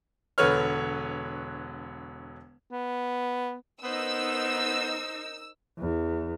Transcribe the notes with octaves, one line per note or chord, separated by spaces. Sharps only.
E1 D3 B4 C#5 F6
B3
B3 D#4 A#4 C5 E6
E2